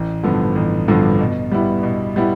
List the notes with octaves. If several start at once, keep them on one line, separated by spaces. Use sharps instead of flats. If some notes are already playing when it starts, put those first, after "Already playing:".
Already playing: A1
G2 D3 F3 B3
A1
G2 D3 F3 B3
B2
G3 B3 E4
B2
G3 B3 E4